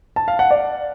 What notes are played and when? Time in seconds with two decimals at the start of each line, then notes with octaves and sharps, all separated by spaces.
0.16 A5
0.28 F5
0.39 F#5
0.51 D5